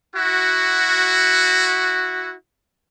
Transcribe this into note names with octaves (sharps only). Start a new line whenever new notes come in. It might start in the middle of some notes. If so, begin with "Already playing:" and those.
E4 F#4